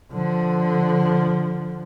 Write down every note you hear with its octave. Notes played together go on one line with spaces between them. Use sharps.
D3 F3